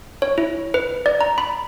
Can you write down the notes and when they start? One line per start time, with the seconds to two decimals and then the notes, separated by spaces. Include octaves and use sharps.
0.22 C#5
0.38 E4
0.74 B4
1.06 D5
1.21 A#5
1.38 B5